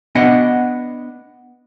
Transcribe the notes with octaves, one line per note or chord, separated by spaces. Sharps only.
B3 D4 D#5 F#5